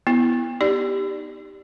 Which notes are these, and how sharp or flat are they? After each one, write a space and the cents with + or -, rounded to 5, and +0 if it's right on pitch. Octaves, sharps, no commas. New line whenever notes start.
B3 +0 E4 +0
D#4 +0 G4 +0 D5 +0